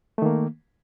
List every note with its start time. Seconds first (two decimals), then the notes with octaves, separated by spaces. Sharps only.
0.18 A3
0.22 D#3
0.26 A#3